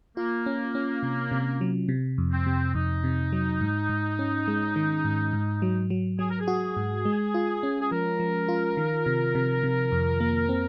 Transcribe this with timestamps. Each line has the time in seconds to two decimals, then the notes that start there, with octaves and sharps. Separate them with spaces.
0.17 A#3 F4
0.46 C#4
0.75 C#4
1.03 C3
1.32 C3
1.61 F#3
1.89 C3
2.18 F2
2.32 C4
2.46 C3
2.75 F2 D#4
3.04 C3
3.33 F#3
3.61 G#2
3.90 G#2
4.19 C#4
4.48 G#3
4.76 D#3
5.05 G#2
5.33 G#2
5.62 F#3
5.90 F#3
6.19 F#3 G#4
6.30 A#4
6.40 G#4
6.48 F#4
6.77 G#2
7.05 G#3
7.34 F4
7.63 C#4
7.81 G#4
7.91 F3 A#4
8.20 F3
8.49 F4
8.77 D#3
9.06 C3
9.35 C3
9.63 C3
9.92 F2
10.20 A#3
10.49 C4